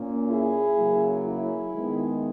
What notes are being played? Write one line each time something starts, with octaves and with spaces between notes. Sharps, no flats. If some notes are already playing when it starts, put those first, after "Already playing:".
Already playing: A#2 A#3 C#4
E4 G#4
C#3 F#3 A#3
E4 G#4
D#3 G#3 B3